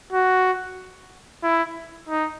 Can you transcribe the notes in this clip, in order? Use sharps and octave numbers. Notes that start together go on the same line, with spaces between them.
F#4
E4
D#4